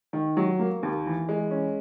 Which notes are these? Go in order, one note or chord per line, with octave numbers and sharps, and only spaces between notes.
D#3
F#3
A#3
D#2
E3
G#3
C#4